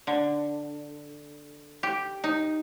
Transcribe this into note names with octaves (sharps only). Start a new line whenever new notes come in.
D3
G4
D#4